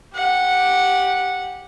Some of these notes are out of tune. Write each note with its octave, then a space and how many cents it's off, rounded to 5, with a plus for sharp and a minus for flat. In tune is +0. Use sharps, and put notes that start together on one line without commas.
G4 +0 F#5 -15